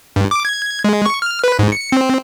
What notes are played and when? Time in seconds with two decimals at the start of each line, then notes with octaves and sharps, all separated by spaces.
0.16 G2
0.31 D6
0.45 G#6
0.84 G#3
1.06 C#6
1.22 F6
1.44 B4
1.59 G#2
1.72 C#7
1.92 C4